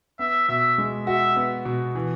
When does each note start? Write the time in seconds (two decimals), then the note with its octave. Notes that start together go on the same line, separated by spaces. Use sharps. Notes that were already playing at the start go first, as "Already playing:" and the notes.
0.19 B3 E5
0.48 B2 E5
0.78 G#3
1.07 F#4 E5
1.36 B3
1.65 B2
1.95 E3